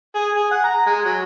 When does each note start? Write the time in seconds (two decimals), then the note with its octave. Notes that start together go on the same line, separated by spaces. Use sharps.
0.15 G#4
0.36 G#4
0.51 F#5
0.64 A#5
0.86 G#3
1.05 F#3